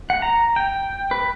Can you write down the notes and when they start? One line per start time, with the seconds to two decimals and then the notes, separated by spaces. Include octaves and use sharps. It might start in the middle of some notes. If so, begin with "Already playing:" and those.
0.10 F#5
0.22 A#5
0.56 G5
1.11 B4